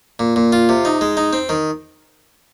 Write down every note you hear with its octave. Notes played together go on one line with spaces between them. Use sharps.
A#2
A#2
F4
C3
D#4
G#3
D#4
C4
D#3